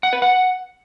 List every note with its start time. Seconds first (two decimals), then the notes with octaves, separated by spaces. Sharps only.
0.03 F#5
0.13 B4
0.22 F#5